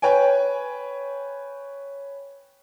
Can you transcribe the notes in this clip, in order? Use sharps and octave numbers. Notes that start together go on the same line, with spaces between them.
B4 C#5 G5 G#5